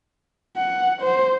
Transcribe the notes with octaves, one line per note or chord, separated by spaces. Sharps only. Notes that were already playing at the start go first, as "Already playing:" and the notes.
F#5
C5